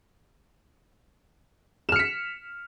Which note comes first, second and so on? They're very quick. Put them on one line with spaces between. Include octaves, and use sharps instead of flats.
E7 F6 C#7 B6